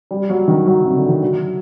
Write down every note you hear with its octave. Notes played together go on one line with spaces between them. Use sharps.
G3
F#3
D#3
F#3
C3
D3
D#3
F#3